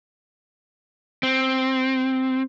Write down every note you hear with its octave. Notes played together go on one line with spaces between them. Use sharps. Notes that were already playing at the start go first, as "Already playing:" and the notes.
C4